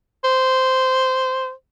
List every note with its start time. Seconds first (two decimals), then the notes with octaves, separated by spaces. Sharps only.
0.24 C5